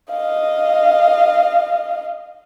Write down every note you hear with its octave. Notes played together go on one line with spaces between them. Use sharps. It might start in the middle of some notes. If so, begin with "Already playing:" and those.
D#5 F5